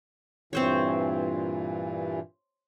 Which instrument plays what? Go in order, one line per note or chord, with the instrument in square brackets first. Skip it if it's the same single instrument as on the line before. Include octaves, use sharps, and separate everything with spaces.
[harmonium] G2 A#2 E3 [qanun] C4 C5 C#5